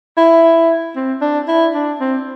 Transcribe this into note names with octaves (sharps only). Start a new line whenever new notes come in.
E4
C4
D4
E4
D4
C4